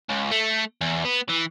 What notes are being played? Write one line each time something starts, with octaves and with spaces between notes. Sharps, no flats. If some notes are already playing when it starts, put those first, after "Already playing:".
C#2
A3
E2
B3
E3